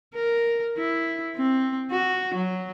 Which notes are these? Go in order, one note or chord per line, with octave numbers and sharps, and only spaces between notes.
A#4
E4
C4
F#4
F#3